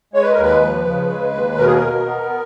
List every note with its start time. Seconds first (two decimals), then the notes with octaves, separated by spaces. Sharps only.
0.14 G#3 C#5
0.22 B4
0.32 A#4
0.37 D#2 B4
0.62 F3
0.85 C#3
1.10 G#3
1.33 D#2
1.58 B2 A#4
1.66 G#4
1.75 A#4
1.82 B2
2.05 B3